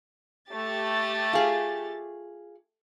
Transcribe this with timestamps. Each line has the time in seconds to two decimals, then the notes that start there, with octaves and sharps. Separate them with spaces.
0.48 A3 G4 A6
1.33 F4 G#4